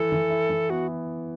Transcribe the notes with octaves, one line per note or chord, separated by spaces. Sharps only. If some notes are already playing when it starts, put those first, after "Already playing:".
Already playing: E3 A4
E3
E4
E3
B3 F#4